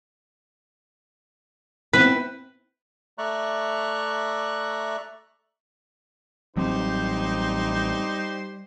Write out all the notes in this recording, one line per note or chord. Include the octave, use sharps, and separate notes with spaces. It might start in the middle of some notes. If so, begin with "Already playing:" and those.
B3 C4 E4 B4
A3 D5 E5 A#5 C#6 F#6
A1 F#3 G3 C4 D#4 G4 C5